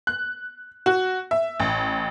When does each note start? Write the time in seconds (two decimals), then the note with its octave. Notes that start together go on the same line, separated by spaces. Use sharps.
0.07 F#6
0.86 F#4
1.31 E5
1.60 A1